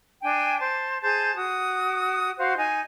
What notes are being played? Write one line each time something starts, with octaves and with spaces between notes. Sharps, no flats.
D4 G5 G#5
C5 A5
G#4 C5 A5 G6
F#4 D#6
F#4 C5 F5
D#4 G#5